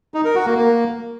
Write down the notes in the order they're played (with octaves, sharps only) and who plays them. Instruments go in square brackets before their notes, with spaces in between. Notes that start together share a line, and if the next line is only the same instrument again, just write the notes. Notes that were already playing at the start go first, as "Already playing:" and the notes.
[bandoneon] D#4
A#4
F#4
A#3
A#3